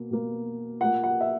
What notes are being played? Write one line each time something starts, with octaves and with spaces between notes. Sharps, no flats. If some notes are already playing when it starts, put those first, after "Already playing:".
Already playing: B2 A#3
B2 A#3
A#2 A#3 F#5
F#5
E5